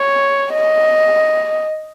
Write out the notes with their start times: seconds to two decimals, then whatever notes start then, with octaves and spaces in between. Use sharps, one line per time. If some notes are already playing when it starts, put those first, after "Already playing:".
Already playing: C#5
0.52 D#5